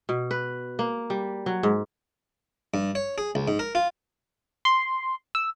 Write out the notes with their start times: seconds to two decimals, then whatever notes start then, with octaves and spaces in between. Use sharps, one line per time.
0.09 B2
0.31 B4
0.79 A#3
1.10 G3
1.46 F#3
1.63 G#2
2.74 G2
2.95 C#5
3.18 G#4
3.35 C#2
3.48 G#2
3.59 A#4
3.75 F4
4.65 C6
5.35 E6